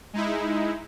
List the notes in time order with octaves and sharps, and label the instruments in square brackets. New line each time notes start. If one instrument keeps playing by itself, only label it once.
[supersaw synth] G#3 D#4 E4